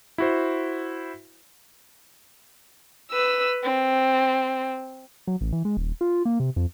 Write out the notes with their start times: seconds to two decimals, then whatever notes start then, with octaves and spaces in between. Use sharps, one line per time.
0.18 E4 F#4 C5
3.11 B4 E6
3.63 C4
5.27 F#3
5.41 A1
5.53 E3
5.65 G#3
5.77 D#1
6.01 F4
6.25 A#3
6.40 C3
6.56 F2